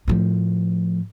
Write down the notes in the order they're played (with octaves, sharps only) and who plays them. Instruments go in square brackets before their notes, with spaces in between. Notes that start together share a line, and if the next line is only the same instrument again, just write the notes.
[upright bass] A2 F3